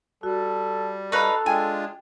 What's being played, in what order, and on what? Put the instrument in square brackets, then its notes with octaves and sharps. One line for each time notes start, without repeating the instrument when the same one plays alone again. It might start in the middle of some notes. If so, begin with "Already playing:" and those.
[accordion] G3 [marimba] F#4 [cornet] A4
[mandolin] D#4 B4 F5 [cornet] A4 [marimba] C#6
[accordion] G#3 D4 F4 [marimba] G5 [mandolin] G#5